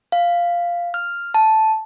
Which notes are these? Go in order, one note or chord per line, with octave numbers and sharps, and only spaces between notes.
F5
F6
A5